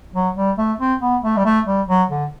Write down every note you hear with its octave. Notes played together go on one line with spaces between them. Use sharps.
F#3
G3
A3
C4
B3
A3
G3
A3
G3
F#3
D3